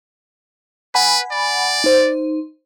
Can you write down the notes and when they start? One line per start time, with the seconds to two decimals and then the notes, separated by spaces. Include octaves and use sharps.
0.95 B4 F#5 G#5 B5
1.31 D5
1.84 D#4 C5